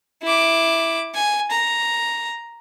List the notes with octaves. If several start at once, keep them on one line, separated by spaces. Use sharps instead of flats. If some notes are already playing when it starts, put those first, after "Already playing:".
E4 D6
G#5
A#5